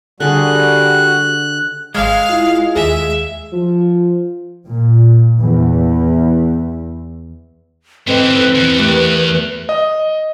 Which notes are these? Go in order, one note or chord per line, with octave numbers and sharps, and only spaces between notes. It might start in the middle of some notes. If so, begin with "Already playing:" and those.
D3 G3 F#4 G#4 F#6
G#1 G#3 F5 F6 G#6
E4 F4
D#2 G#4 E5
F3
A#2
E2
G#2 E3 C4 A4 B4 D#5
E2
A3 G4 A#4
D#5